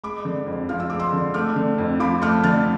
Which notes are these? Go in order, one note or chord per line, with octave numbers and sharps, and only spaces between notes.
G#3 B5 D6
D3
F2
F3 F6
E6
G#3 D6
C6 E6
D3
A3 D6 F6
D3
F2
F3 B5 D6
A3 D6 F6
D3 F6 A6